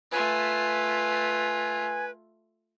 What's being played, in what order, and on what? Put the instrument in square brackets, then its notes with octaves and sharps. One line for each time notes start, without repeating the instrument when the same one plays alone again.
[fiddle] A3 F4 [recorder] B4 [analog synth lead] G#5